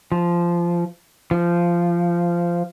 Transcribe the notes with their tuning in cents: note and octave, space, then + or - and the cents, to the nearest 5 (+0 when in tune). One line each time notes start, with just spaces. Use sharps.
F3 -15
F3 -15